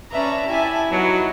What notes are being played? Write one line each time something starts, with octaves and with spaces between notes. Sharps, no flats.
C#4 B4 D5 E5 A5 A#5
E4 G4 G#5
F#3 B3 D#4